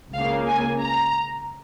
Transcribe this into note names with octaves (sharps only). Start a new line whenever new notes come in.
C#2 C#3 A#3 F5
G#5
A#5